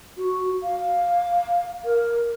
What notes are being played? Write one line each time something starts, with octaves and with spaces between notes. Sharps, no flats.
F#4
F5
A#4